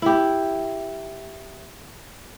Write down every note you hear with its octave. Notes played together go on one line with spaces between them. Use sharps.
E4 G4